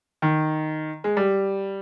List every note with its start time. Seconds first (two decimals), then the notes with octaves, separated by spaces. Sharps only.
0.22 D#3
1.04 G#3
1.17 G3